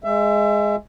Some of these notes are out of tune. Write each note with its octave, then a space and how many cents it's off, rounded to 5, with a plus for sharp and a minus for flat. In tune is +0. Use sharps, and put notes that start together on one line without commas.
G#3 +0 E5 +25